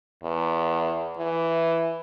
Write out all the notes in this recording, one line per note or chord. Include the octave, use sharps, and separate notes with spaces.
E2
E3